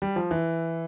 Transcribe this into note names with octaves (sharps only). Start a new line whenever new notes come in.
G3
F3
E3